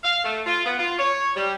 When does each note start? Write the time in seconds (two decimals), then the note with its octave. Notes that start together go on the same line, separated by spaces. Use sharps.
0.03 F5
0.24 A3
0.46 F4
0.65 B3
0.78 F4
0.98 C#5
1.36 G3